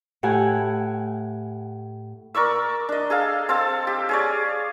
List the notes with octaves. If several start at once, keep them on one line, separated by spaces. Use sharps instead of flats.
A2 A3 G4 F#5 G#5
A#4 D5 C#6 E6
D4 D#5
G#4 A4 F5
C4 A4 F5 A5
G4
G#4 C#5 D5